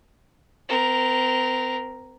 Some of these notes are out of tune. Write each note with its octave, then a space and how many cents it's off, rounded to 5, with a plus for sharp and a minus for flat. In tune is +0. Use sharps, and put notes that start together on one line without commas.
C4 -35 A#4 +0